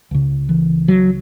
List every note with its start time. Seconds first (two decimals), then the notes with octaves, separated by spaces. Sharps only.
0.11 C#2 C#3
0.49 E3
0.88 F#3